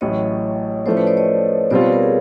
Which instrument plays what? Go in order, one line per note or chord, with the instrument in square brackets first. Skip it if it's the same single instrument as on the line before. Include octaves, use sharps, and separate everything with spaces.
[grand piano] A1 A2 F#3 [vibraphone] C#5 D#5
[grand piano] A2 F3 A3 C#4 [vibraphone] C5 D5
[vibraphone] B4 C#5
C5 D5
C#5 D#5
[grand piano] B2 G3 C4 F4 [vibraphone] C5 D5
[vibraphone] B4 C#5
A#4 C5
G#4 A#4